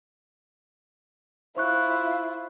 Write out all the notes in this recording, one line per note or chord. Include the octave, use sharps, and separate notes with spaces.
E4 F4 C5 C#6 F#6